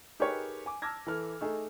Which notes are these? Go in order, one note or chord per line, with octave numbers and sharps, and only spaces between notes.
D#4 G4 G#4 A#4 B4 C#5
G#5 D6
A5 D6 E6 F6 G#6 A#6
E3 A4 F6
A3 D#4 G#4